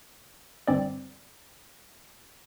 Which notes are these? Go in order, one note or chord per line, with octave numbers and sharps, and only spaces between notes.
G1 G2 C4 D5